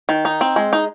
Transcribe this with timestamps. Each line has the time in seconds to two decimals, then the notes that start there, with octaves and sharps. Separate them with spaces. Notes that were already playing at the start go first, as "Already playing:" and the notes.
0.09 D#3
0.25 D#4
0.41 C4
0.56 G#3
0.73 D#4